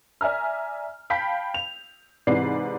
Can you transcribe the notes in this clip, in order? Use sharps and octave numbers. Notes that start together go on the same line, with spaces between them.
D5 E5 G#5 A#5 F6
F5 G5 A5 B5 G6 B6
F7
G#2 C3 E3 B4 D5 C7